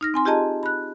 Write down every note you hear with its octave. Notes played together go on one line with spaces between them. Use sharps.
D#4 F6 A#6
C4 G#5 C6
F4 G4 G#4 D#5 A5 A#5
B5 F#6